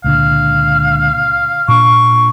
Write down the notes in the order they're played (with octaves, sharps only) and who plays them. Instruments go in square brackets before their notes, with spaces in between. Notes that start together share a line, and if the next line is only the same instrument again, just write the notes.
[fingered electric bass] C#2 A#2 D3 [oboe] F5
[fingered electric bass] A#2 D4 [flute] C#6